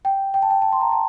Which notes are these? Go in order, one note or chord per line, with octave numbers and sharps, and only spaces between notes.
G5
G5
A5
G5
A5
C6
A#5
A5